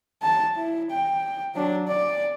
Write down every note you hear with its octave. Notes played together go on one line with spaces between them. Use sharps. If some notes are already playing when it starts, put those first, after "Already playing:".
A5
E4
G5
F#3 D4
D5